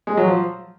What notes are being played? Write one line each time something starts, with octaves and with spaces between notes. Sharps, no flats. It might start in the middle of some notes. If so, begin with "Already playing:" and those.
G#3
F#3
F3